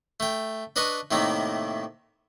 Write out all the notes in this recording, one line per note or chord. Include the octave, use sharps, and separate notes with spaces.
A3 G5
D4 B4 D#5 B5 C#6
A2 C3 D#3 A3 A#3